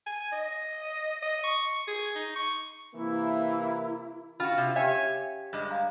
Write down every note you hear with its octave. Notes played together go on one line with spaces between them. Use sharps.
G#5
D#5
D#5
C#6
G#4
D#4
C#6
C3 E3 A#3 E4
C#4 F4 F#4 F5 B5
C3
G4 C#5 E5 G5 G#5
G2 G#3
F5 A#5